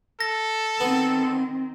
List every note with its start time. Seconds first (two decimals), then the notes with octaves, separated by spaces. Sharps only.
0.20 A4 A#6
0.80 D#3 B3 C4